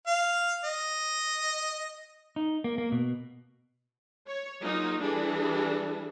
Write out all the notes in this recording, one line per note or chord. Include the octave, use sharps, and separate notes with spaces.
F5
D#5
D#4
A#3
A#3
B2
C#5
F#3 A#3 D#4 F4 G#4
E3 G3 D4 G#4 A4